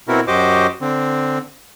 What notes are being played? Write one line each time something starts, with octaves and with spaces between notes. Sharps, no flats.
B2 C4 E4 F#4 A#4
F#2 F#4 G4 C5 D#5 D6
D3 C4